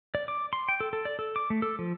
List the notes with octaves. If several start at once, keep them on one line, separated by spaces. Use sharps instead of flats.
D5
D6
C6
G5
A4
A4
D5
A4
D6
A3
A4
F3